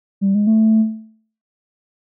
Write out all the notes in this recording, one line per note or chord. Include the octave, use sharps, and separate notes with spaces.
G3
G#3
A3